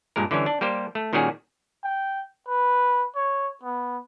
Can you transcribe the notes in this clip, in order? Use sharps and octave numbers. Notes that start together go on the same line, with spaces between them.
G2 A#2 G#3 A#4
D3 E3 G3 C#4
D4
G3 A#3 G4 C5
A3
A#2 D#3 G3 C#4 F#4 G#4
G5
B4
C#5
B3